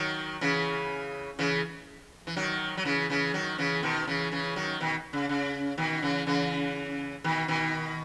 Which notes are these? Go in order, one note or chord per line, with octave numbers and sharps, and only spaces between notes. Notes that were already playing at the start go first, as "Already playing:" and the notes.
Already playing: D#3 F#3
C#3 E3
C#3 E3
E3
D#3 F#3
F#3
C#3 E3
C#3 E3
D#3 F#3
C#3 E3
B2 D#3
C#3 E3
C#3 E3
D#3 F#3
B2 D#3
C#3
C#3
B2 D#3
C#3 E3
C#3 E3
B2 D#3
B2 D#3